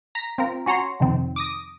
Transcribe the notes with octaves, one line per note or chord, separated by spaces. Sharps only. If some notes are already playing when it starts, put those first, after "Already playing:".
A#5 A#6 B6
C4 F4 A#4
C#4 F#4 C#5 A#5 C6
F2 C3 D#3 C4
D6 D#6 A#6